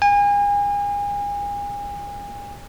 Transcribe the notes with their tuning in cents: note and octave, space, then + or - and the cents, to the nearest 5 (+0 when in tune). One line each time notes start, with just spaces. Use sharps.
G#5 -35